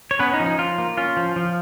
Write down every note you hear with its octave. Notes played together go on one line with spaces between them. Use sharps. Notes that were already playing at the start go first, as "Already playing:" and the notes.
C#5
B3 C#4 B4
D#4
F3
D#4
F3 F4
A#3
C#4 F4
F3
F3